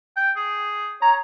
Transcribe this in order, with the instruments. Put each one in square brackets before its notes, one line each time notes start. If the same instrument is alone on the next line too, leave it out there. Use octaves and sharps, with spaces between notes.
[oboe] G5
G#4
[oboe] C#5 [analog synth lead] A#5